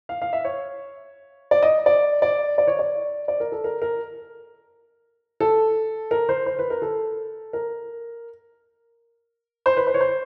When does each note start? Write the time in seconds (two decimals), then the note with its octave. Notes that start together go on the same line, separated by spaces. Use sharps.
0.09 F5
0.22 F5
0.33 E5
0.45 C#5
1.51 D5
1.63 D#5
1.86 D5
2.22 D5
2.58 D5
2.67 C#5
2.79 D5
3.28 D5
3.40 A#4
3.52 A4
3.64 A#4
3.82 A#4
5.40 A4
6.11 A#4
6.29 C5
6.46 C5
6.59 B4
6.70 A#4
6.82 A4
7.53 A#4
9.66 C5
9.77 B4
9.87 C5
9.94 C#5
10.00 C5